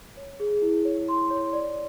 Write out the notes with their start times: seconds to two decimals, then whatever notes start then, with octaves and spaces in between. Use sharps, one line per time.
0.17 C#5
0.40 G#4
0.62 E4
0.85 C#5
1.08 C6
1.30 C#5
1.53 D5